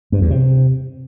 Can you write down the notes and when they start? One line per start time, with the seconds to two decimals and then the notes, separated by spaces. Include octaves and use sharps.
0.12 G2
0.21 E2
0.31 C3